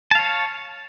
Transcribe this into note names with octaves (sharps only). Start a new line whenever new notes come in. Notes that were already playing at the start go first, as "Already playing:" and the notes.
C#5 F5 A5